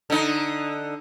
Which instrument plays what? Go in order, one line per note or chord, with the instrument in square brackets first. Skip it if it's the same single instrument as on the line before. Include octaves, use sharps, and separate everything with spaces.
[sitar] D3 D#4